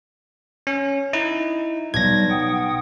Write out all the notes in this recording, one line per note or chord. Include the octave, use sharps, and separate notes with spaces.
C#4
D#4 E4
B1 F#3 G3 G#6 A#6
F#5 G5 D#6